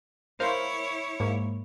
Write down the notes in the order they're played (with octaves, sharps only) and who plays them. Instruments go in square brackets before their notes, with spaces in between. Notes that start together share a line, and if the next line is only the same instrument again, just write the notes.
[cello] E4 C#5 [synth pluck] A#4 C5 F5
[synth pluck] G#2 A#3